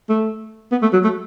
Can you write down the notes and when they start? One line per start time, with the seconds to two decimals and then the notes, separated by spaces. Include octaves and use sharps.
0.10 A3
0.72 B3
0.82 A3
0.93 F#3
1.04 A3